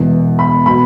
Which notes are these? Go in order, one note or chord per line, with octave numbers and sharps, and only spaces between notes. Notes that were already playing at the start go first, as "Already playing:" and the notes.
Already playing: E1 E2 E3
B5
B2 B5